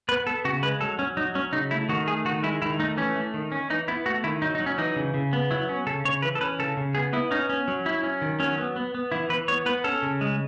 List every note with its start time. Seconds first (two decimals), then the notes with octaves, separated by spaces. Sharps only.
0.09 B3 B4
0.27 B3 A4
0.45 C#3 F#4
0.63 G#3 B4
0.81 F#3 A4
0.99 F#3 C#4
1.17 F#3 D#4
1.35 F#3 C#4
1.53 C#3 D#4
1.71 A3 E4
1.89 D#3 F#4
2.07 A3 G#4
2.25 D#3 F#4
2.43 G#3 E4
2.62 D#3 E4
2.80 A3 D#4
2.97 E3 C#4
3.16 A3
3.34 D#3
3.52 C#4
3.70 E3 D#4
3.88 B3 E4
4.06 A3 F#4
4.24 D#3 E4
4.42 F#3 D#4
4.55 D#4
4.60 F#3
4.66 C#4
4.78 E3 D#4
4.96 C#3
5.14 C#3
5.33 B3
5.51 F#3 E4
5.69 C#4
5.86 C#3 A4
6.05 C#3 C#5
6.22 E3 B4
6.35 A4
6.41 C#4 B4
6.59 C#3 A4
6.77 C#3
6.95 B3 G#4
7.13 B3 E4
7.31 C#4 D#4
7.49 C#4
7.68 F#3
7.85 F#3 E4
8.03 C#4
8.22 D#3
8.40 F#3 C#4
8.58 B3
8.76 B3
8.95 B3
9.12 E3 E4
9.30 E3 B4
9.48 B3 C#5
9.66 B3 B4
9.84 C#4 A4
10.02 C#3
10.21 G#3